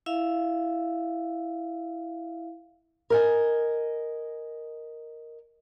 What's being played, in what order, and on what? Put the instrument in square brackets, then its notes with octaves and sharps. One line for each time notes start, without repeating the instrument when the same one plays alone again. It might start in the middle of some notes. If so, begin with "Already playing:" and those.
[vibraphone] E4 E5 F5
[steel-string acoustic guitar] A#4 D#5 G#5